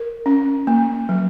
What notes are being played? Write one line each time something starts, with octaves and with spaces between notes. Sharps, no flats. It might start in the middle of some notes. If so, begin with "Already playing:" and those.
Already playing: A#4
C#4
A#3
F#3